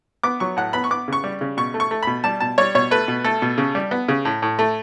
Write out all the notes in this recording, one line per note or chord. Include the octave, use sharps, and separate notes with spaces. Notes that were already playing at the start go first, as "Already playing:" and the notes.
B3 D6
F#3 C#6
A2 F#5
B3 B5
C#6
B3 D6
C#3 C#6
G3
C#3
B2 C#6
A3
C#6
A3
B2 B5
G3 A5
B2 A5
G3 C#5
B2 C#5
A3 B4
B2
A3 A4
B2
C#3
G3
B3
C#3
A2
A2
A3